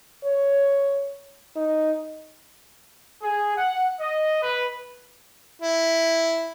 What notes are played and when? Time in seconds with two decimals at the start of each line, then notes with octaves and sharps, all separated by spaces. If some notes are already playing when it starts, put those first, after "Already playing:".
0.24 C#5
1.56 D#4
3.22 G#4
3.57 F#5
4.00 D#5
4.43 B4
5.62 E4